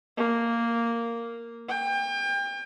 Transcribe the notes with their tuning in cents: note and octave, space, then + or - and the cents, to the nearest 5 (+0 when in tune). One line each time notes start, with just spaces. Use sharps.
A#3 -5
G5 +35